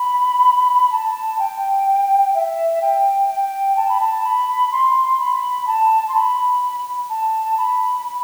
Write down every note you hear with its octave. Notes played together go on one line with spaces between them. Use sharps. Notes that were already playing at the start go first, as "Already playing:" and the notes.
Already playing: B5
A5
G5
E5
G5
G5
A5
B5
A5
B5
C6
B5
A5
C6
B5
A5
B5
B5